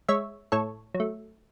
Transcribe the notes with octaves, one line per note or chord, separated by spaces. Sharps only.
G#3 C#5 E5
A2 A4 C#5
F#3
A3